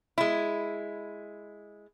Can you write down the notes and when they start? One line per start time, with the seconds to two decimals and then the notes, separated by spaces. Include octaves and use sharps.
0.18 G#3 E4